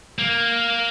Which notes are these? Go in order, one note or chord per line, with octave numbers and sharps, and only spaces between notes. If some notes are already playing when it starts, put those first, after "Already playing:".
A#3